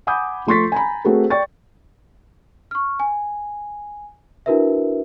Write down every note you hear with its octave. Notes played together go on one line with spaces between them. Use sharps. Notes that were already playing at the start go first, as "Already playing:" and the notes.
F#5 G#5 B5 D6 D#6 G6
F3 A3 C6 C#6 A6 B6
G#5 A#5 B5
A3 C4 F#4 G#4 A#4
D5 G5 C#6 A6
C#6 F6
G#5
D4 E4 F#4 A#4 B4 E5